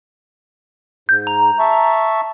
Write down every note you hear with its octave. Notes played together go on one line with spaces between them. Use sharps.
G#2 G6
A#5
E5 A5 C#6